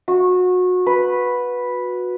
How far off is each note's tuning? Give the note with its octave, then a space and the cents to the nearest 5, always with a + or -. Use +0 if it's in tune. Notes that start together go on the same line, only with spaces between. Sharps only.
F#4 -25
B4 -5